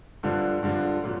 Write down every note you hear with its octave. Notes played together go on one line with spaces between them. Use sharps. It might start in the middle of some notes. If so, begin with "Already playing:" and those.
G2 D3 F3
G2 D3 F3
A#2 F#3